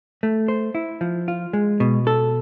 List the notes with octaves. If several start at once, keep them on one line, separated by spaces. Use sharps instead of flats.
A3
C5
E4
F3
F4
G#3
B2
A4